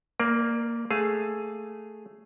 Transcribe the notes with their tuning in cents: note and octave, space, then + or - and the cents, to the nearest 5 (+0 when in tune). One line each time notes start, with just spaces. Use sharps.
A#3 -5 A#4 +35 D5 +20
A3 +5 G#4 +0 F5 +0